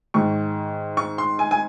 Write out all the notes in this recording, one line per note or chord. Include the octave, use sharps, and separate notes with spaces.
G#2 D#3 C#6
C#6
C6
G#5
G#5